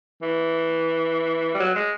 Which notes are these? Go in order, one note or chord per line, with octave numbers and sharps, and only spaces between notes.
E3
G3
F#3
G#3